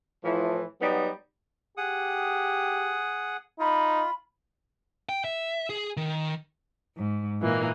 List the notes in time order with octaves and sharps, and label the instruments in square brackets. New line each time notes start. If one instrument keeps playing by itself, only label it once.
[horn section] A2 E3 F3
F#3 G3 B3 D#4
[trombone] G4 [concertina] G#4 F#5 D#6
[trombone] D#4 [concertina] F4 [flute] B5
[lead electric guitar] G5
E5
G#4
D#3
[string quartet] G#2
A#2 E3 A#3 D#4